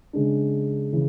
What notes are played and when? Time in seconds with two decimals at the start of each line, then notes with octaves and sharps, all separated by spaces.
0.13 C#3 G#3 D4
0.92 C#3 E3